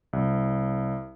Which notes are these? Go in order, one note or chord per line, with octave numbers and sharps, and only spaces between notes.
C2